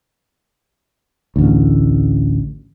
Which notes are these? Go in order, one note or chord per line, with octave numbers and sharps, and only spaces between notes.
A1 D2